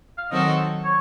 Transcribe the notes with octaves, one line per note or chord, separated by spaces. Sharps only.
F5
D#3 F#3 C4 F#4 A4 D#5
C#5